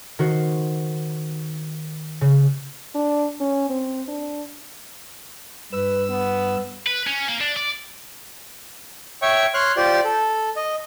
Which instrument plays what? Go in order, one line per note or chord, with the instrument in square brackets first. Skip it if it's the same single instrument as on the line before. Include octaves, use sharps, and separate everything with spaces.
[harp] D#3 F#4 C5
C#3
[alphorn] D4
C#4
C4
D4
[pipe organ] G2 E6 [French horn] B4
[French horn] B3
[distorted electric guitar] B4
C#4
A#3
D4
D5
[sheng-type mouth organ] C#5 E5 G5 C#6
C#5 C6 F6 F#6
F4 G4 C5 D5
A4
D#5